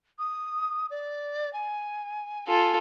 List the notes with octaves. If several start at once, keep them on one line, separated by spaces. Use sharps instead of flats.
D#6
D5
G#5
F4 A4 G#5